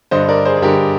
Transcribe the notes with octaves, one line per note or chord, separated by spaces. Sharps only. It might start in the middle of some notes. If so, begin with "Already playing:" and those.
G2 D3 C5 D#5
A#4 D5
G#4 C5
G#4
G2 D3 G4 A#4